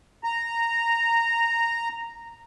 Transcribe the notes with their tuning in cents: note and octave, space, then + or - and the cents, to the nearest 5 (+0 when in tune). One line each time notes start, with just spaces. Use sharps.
A#5 -10